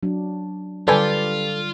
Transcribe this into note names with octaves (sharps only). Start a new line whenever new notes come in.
F#3 D4
D3 G3 F4 G4 A4 B4 D5 G#5